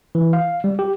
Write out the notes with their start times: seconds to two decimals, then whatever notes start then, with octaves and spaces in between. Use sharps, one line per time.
0.15 E3
0.33 F5
0.64 G3
0.79 G4